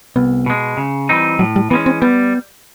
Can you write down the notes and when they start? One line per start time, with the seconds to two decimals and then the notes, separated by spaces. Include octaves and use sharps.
0.16 C2 B3
0.46 B2 G#3
0.77 C#3
1.09 E3 G3 C4 D#4
1.39 A2 F#3
1.56 G3
1.70 E3 G#3 B3 C#4
1.86 C4
2.02 G3 B3